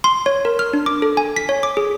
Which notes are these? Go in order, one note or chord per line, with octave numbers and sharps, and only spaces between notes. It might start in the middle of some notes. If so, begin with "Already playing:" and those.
C6
C#5
A#4
F6
D4
D6
A4
G#5
B6
C#5
D6
G#4